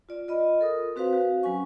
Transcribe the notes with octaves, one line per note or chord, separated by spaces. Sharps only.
F4 D5
F4 D#5 B5
A4 A#4 D#6
C4 F#4 B4 C5 F5
F#4 F5
F#3 C#4 G#5 C#6